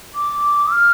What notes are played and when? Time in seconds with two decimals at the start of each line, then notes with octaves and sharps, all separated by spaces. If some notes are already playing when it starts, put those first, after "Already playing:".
0.15 D6
0.72 F6